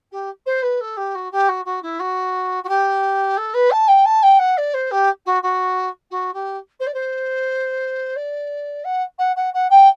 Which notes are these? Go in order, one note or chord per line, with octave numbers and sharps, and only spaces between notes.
G4
C5
B4
A4
G4
F#4
G4
F#4
F#4
E4
F#4
F#4
G4
A4
B4
A5
G5
A5
G5
F#5
D5
C5
G4
F#4
F#4
F#4
G4
C5
D5
C5
D5
F#5
F#5
F#5
F#5
G5